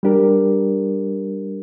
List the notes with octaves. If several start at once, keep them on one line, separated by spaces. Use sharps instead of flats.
G3 D4 G4 A#4